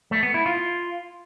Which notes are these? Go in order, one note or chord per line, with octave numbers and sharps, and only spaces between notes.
A3
B3
E4
F4